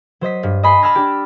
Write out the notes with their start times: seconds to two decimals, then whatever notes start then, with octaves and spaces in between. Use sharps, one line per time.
0.21 F#3 C5 D#5 B6
0.43 G2
0.63 D#5 G#5 B5 C6 B6 C7
0.82 A5 B5 E6 F6 G#6 A#6
0.95 D4 G4